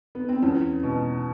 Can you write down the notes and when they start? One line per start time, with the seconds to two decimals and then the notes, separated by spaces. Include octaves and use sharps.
0.15 B3
0.29 C4
0.42 E2 C#4
0.83 B2